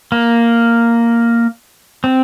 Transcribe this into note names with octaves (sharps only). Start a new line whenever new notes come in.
A#3
C4